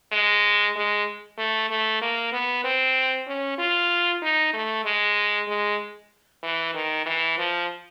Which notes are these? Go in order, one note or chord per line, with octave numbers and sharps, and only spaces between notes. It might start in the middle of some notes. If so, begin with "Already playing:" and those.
G#3
G#3
A3
A3
A#3
B3
C4
C#4
F4
D#4
A3
G#3
G#3
E3
D#3
E3
F3